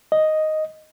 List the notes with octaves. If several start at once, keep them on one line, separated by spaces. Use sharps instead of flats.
D#5